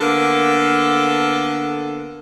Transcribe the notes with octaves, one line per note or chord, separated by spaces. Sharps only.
D3 A#3 B3 A4